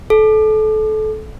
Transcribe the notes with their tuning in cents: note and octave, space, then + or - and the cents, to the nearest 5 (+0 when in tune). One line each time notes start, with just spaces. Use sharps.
A4 -25